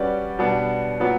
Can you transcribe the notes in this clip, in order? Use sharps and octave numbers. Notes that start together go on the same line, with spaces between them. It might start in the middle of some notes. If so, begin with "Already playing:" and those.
Already playing: G3 C#4 F#4 B4 D5
B2 G3 B3 D4
A#2 F#3 B3